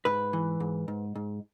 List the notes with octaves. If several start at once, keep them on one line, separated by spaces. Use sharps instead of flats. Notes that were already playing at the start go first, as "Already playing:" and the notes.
G#2 B4
E3
G#2
G#2
G#2